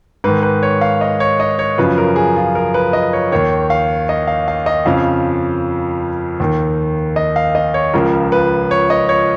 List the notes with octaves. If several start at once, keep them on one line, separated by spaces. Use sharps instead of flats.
G#2 D#3 B4
B4
C#5
F5
D#5
C#5
D#5
C#5
F#2 C#3 F3 B4
A#4
G#4
F4
A#4
B4
D#5
C#5
D#2 D#3 C#5
F5
D#5
F5
F5
D#5
F2 C#3 F3 F5
D#2 D#3
D#5
F5
D#5
C#5
C#2 C#3 F3 A#4
B4
C#5
D#5
C#5